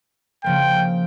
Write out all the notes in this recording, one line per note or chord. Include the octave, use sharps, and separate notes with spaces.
C#3 F3 A#3 G5